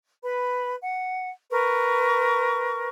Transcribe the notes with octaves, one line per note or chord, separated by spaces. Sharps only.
B4 B5
F#5
A#4 B4 C#6